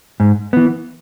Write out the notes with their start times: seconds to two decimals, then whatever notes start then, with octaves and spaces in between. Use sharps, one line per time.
0.20 G#2
0.53 E3 B3